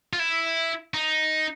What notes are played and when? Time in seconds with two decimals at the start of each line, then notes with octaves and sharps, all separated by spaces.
0.13 F4
0.19 E4
0.94 D#4